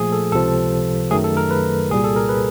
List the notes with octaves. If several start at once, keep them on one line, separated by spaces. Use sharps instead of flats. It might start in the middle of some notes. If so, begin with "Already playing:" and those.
Already playing: A#2 F3 A3 G#4
A4
C#2 C3 F3 A4
F#2 D#3 F#3 A3 G#4
A4
A#4
B4
C2 A#2 G3 G#4
A4
A#4
B4